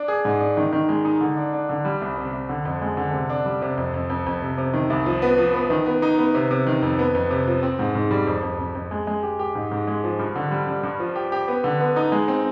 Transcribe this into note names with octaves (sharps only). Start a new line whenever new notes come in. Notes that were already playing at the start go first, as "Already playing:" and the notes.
Already playing: D4
G#4
G#2
D4
D#3
D#3
G#3
D#4
D3
D4
D4
D3
G3
C2
C3
C2
D3
F2
G#3
D3
C3
D4
G3
C3
F2
F2
F2
F2
C3
C3
D#3
C2
F3
B3
F3
B3
D#3
B3
D#4
B3
C3
C3
D#3
F2
B3
F2
C3
F3
C4
G#2
G#2
G3
F2
F2
F2
F2
G#3
G#3
G4
G4
G#2
G#2
G#3
F3
G2
D3
G3
G3
G2
F3
G4
G4
B3
D3
B3
D#4
G#3
C4